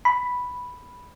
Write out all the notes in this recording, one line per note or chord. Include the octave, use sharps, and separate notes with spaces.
B5